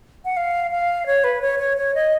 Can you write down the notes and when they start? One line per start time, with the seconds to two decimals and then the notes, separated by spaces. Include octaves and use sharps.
0.25 F#5
0.37 F5
0.71 F5
1.06 C#5
1.24 B4
1.42 C#5
1.59 C#5
1.77 C#5
1.95 D#5